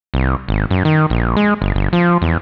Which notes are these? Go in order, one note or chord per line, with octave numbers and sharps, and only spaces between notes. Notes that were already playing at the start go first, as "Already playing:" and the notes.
C2
G#1
F#2
D#3
A#1
G#3
G1
G1
F3
E2